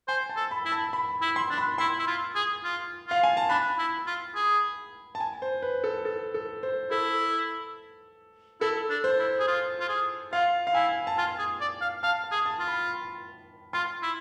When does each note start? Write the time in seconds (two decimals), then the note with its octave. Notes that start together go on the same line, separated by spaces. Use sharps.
0.08 C5 G#5
0.29 A5
0.37 A4
0.51 B5
0.65 E4
0.72 A5
0.93 B5
1.22 E4
1.36 C6
1.50 D4
1.58 B5
1.78 E4 C6
1.99 E4
2.08 F4
2.35 G#4
2.64 F4
3.07 F4 F5
3.23 G#5
3.37 A5
3.50 D4 B5
3.78 E4
4.07 F4
4.35 G#4
5.15 A5
5.20 G#5
5.42 C5
5.62 B4
5.84 A4
6.05 A4
6.34 A4
6.63 C5
6.91 E4 A4
8.61 E4 A4
8.90 D4
9.04 C5
9.19 E4
9.39 G#4
9.47 F4
9.80 F4
9.89 G#4
10.32 F4 F5
10.67 F5
10.74 E4 G#5
11.07 A5
11.18 F4 G#5
11.39 G#4
11.61 D5
11.81 F5
12.03 F5 A5
12.24 A5
12.31 G#4
12.46 A5
12.59 F4
12.67 B5
13.73 F4 C6
14.02 E4